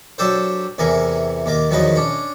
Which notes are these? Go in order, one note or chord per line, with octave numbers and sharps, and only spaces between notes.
F#3 D4 G4 A4 C5
E2 C3 E3 A#4 G#5
D#2 A#4 D6
E2 D#3 F3 F#3 B4 D#5
C#4 D4